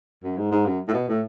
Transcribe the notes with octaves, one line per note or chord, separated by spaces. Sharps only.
F#2
G#2
G#2
F#2
A2
B2
A2